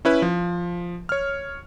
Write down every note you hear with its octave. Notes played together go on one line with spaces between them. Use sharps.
C#4 E4 B4
F3
C#5 F6